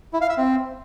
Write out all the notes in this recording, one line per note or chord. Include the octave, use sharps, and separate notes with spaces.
E4
F5
E5
C4